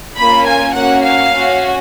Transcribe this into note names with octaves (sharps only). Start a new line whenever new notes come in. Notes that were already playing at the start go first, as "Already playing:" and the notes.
A#3 C#4 F4 B5
G#5
A#3 C#4 F#4 F#5
F5
C#4 F#4